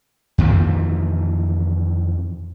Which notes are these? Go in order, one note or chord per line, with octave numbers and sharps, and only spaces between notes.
F2 A#2 D#3 E3